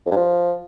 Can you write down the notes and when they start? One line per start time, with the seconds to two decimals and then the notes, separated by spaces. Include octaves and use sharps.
0.06 F2
0.11 G2
0.16 F3